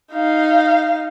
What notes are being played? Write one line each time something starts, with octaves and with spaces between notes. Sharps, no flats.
D#4 F5